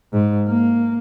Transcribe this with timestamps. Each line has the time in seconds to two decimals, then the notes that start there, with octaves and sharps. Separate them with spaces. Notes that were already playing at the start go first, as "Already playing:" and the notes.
0.13 G#2
0.48 A#3